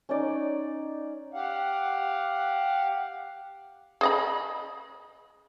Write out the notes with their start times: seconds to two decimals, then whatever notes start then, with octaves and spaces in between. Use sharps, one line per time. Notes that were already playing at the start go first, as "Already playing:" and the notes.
0.09 C#4 D#4 D5
1.34 G4 F5 F#5
4.01 G#4 D#5 B5